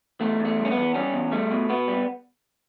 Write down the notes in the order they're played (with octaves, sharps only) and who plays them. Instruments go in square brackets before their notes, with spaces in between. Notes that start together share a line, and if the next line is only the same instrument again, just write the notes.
[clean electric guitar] E2 A3
E2
A3
G3
C#4
B3
E2
G3 C#4
E2
G3 A3
B2
B2 B3
G3